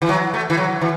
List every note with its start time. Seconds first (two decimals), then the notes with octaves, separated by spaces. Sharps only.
0.02 E3
0.09 F#3
0.34 A3
0.50 E3
0.57 F#3
0.81 E3